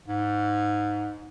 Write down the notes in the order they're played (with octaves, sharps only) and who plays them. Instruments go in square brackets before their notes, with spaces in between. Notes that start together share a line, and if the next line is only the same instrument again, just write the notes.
[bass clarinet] G#2